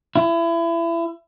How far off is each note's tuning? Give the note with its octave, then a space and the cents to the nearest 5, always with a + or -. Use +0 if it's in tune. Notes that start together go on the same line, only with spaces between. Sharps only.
E4 +30